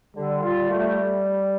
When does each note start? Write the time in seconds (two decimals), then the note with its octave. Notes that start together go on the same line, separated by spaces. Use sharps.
0.16 D3 G3
0.43 F4
0.70 A3